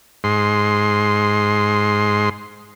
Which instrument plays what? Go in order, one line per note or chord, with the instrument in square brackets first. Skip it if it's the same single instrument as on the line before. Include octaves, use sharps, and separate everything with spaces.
[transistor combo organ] G#2 C6